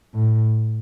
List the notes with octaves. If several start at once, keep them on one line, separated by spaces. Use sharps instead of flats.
A2